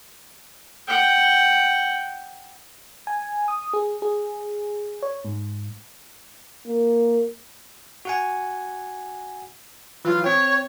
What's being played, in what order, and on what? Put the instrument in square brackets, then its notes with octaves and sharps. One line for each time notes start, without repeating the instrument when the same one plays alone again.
[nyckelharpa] F#5 G5
[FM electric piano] G#5
D#6
G#4
G#4
C#5
G#2
[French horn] A#3
[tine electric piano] F#4 F#5 G#5
[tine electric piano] E3 F#3 [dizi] F4
[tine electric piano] C4 G5 [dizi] C#5